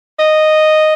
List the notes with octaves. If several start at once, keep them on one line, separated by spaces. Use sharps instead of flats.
D#5